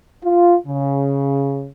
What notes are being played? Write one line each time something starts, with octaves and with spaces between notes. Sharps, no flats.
F4
C#3